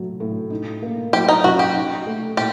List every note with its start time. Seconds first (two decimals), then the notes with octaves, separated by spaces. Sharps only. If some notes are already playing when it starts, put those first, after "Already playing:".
Already playing: A2 F#3 A3
0.20 A2
0.50 D#4
0.82 A#3
1.13 F#3 G4
1.29 D#4
1.44 F#2 F#4
1.59 G4
1.75 D#4
2.06 A3
2.37 A#2 G4